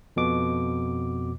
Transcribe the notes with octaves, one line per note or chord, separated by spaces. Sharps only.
F2 B2 D6